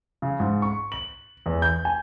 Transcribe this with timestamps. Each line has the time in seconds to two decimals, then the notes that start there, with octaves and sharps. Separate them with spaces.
0.22 C#3
0.40 G#2
0.62 C#6
0.92 F#7
1.46 E2
1.62 G6
1.85 G#5